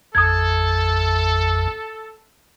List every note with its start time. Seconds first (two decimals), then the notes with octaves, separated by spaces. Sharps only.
0.15 A1 F2 A4 D#6 G#6